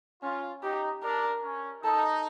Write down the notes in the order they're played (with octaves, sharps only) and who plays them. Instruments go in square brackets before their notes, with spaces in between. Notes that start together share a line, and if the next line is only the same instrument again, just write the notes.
[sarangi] C#4 [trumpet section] F4
[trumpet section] D#4 [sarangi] G4
[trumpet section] D4 [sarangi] A#4
[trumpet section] C#4
[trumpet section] D#4 [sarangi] A4